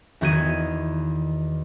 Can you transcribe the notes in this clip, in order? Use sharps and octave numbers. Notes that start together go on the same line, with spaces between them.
E2 D#3 F#4 G6 G#6 D#7